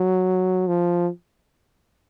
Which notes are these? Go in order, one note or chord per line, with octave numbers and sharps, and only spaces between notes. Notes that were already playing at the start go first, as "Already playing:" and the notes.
Already playing: F#3
F3